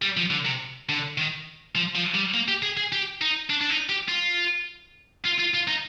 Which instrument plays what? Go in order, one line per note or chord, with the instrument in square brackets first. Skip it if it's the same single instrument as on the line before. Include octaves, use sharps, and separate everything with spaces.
[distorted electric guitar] G3
F3
D3
C3
D3
D#3
F3
F3
G3
A#3
G4
G#4
G#4
G4
D#4
D4
D4
D#4
G4
F4
F4
F4
F4
D#4